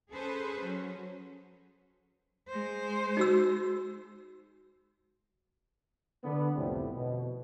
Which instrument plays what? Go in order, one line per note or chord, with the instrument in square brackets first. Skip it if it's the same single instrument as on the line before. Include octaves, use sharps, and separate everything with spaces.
[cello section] C#4 G#4 A4 B4 C5
F#3 C#4
[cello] G#3 C5
[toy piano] D#4 F#4 E6
[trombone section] D3 B3
C2 F2 A2 C3 G3 A3
B2